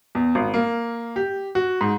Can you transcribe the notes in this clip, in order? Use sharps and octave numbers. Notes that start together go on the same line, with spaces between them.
E2
G#1
A#3
G4
F#4
G#2